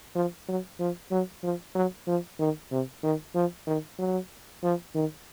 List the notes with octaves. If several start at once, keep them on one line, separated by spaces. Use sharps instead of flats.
F3
F#3
F3
F#3
F3
F#3
F3
D#3
C3
D#3
F3
D#3
F#3
F3
D#3